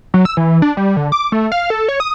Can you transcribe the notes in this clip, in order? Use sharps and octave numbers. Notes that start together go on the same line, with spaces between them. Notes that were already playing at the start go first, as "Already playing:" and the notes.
F#3
E6
E3
D4
G3
D3
D6
A3
F5
A4
C#5
D#6